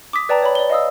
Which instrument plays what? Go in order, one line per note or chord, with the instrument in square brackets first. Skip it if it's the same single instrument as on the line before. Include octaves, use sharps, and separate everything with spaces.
[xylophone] D6 D#6 B6
B4 D5 G5 A5 A#5
C#5 B5
D5 G7
D#5 F5 D#6 E6